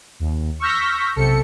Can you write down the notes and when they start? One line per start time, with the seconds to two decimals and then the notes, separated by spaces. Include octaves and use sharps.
0.19 D#2
0.60 C#6 E6 F6 G6 A#6 B6
1.16 B1 C3 A4 C#7